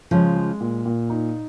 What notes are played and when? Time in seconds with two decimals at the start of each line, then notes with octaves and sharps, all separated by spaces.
0.11 C#3 F3 G#3
0.36 G#3
0.61 A#2
0.85 A#2
1.10 D#4